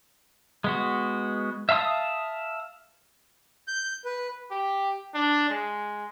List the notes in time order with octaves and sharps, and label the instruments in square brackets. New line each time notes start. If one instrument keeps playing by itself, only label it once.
[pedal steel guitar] G#3 B3 F#4
E5 F5 A5 C6 D#6
[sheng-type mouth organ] G6
B4
[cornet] G4
D4
G#3